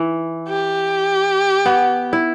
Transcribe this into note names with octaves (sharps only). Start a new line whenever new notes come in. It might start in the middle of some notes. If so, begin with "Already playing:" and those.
Already playing: E3
G4
B3
E4